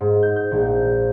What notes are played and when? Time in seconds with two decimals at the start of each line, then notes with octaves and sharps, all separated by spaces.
0.01 G#2
0.23 G6
0.36 G6
0.51 A#1